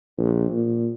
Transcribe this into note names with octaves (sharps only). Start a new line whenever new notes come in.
A#1
A#2